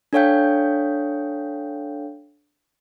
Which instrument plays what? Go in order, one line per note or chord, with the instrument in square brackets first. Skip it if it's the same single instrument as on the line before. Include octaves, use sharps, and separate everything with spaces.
[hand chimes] D4 A4 C#5 F5 G5 G6